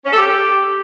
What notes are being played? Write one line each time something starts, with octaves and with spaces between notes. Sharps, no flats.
C#4
A4
G4